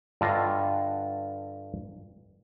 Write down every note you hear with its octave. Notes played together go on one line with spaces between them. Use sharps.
G2 D3 F4 D#5